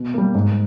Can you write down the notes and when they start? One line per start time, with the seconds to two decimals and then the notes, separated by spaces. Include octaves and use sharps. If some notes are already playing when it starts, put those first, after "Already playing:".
Already playing: B2
0.14 G3 A#3
0.34 G#2